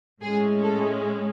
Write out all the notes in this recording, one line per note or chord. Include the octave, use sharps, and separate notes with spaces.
A2 G#3 C#4 G#4
A4